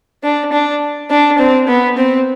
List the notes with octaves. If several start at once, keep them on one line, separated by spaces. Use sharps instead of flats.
D4
D4
D4
C4
B3
C4